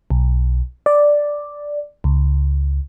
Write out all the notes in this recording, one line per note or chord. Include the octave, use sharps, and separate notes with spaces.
B1
D5
C#2